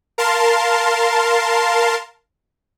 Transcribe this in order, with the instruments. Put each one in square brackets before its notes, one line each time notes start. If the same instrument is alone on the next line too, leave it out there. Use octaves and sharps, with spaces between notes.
[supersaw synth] A#4 F5 A5 C6